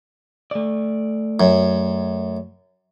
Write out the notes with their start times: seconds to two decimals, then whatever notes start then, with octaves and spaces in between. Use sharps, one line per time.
0.51 A3 D5
1.40 F#2